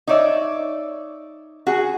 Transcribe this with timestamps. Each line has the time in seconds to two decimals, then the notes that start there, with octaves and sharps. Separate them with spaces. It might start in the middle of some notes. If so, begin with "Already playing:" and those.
0.07 D#4 C#5 D5 E5
1.67 F#4 G#4